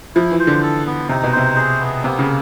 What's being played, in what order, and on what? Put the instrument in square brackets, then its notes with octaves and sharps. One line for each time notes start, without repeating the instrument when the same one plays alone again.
[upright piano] F3 [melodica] E4
[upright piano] E3
[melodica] C5
[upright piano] D3
[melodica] A4
B3
[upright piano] C3 [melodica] D#4
[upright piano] B2
[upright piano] C3 [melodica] C5
[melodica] G#4
B3
[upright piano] C3 [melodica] A#3
[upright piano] C#3